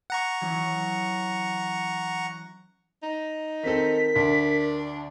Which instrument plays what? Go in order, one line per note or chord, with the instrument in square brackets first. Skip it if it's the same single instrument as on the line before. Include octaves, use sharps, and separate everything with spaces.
[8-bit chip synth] F#5 A#5 C#6
[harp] E3 F#3 C#4
[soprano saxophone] D#4
[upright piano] D#3 C4 A4 [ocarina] A#4 [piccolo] B6
[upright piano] D2 [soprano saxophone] D4